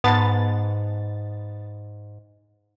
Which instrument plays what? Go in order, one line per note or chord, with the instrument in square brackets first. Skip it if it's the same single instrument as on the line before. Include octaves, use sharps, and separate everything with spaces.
[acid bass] G#2 [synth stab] B3 A6 [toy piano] F#5 A5 B5